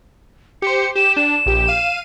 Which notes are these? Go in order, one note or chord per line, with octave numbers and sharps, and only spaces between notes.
G4 C5 C#7
G4 E7
D4 E7
A#1 G4
F5 D#7